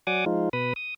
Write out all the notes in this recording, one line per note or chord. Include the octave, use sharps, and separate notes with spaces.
F#3 D5 F#5 G#5 D6 D#6
F3 G#3 D#4 F4
B2 B4 B5 D#6
D#6